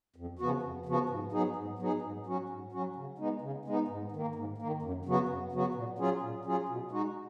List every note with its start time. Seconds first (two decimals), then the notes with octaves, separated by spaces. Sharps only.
0.16 F2
0.39 C#3 F3 B3 F#4
0.63 F2
0.86 C#3 F3 B3 F#4
1.09 G#2
1.32 F#3 B3 D#4 G#4
1.56 G#2
1.79 F#3 B3 D#4 G#4
2.02 G#2
2.26 F#3 C#4 F#4
2.49 G#2
2.72 F#3 C#4 F#4
2.96 C#3
3.18 G#3 B3 D#4
3.41 C#3
3.65 G#3 B3 D#4
3.88 G#2
4.12 D#3 A#3
4.35 G#2
4.58 D#3 A#3
4.82 F#2
5.05 C#3 F#3 B3 F#4
5.28 F#2
5.52 C#3 F#3 B3 F#4
5.74 A#2
5.98 F#3 C#4 F4 G#4
6.21 A#2
6.45 F#3 C#4 F4 G#4
6.69 B2
6.91 G#3 D#4 F#4